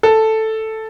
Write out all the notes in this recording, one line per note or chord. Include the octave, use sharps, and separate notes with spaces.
A4